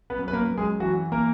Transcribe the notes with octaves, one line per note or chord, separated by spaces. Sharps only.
B3 B4
F#2
B4
A#3 A#4
F#2
G#3 G#4
E3 F#3 F#4
A#3 A#4